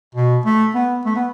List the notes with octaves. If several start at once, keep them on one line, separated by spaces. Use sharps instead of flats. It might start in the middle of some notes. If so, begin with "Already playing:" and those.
B2
A3
B3
A3
B3